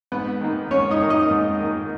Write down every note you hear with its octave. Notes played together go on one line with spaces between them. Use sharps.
G#2 B3 B4
D#3 A#3
G#2 C#4 C#5
D#4 D#5
D#3 A#3
D#4 D#5
G#2
D#3 A#3